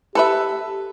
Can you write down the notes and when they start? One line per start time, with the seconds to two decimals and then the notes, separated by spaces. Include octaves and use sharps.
0.15 G4 A4 B4 E5